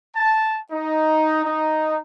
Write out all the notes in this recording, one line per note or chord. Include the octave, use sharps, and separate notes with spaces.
A5
D#4
D#4